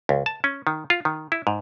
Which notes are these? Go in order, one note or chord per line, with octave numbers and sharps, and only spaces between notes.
C#2
A5
C#4
D#3
F4
D#3
E4
G#2